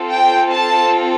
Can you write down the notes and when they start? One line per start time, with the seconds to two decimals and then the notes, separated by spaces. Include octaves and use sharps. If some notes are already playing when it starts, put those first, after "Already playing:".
Already playing: C4 F4 A4
0.11 G5
0.51 A5